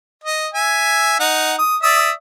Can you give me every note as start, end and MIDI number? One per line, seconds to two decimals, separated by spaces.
0.24 0.48 75
0.54 1.18 76
0.54 1.18 80
1.20 1.56 63
1.20 1.56 78
1.59 1.77 87
1.83 2.11 74
1.83 2.11 76
1.83 2.11 87